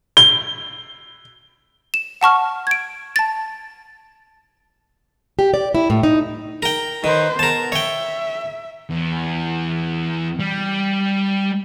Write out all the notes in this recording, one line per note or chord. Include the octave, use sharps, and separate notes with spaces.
G7
E7
F#5 A5 C#6 F6
G#6 D7
A5 A6
G4
D5
E4
A2
D#4
A#4 G5
D#3 B4 C5
B3 A#4 A5
C#5 E5 G5
E2
G3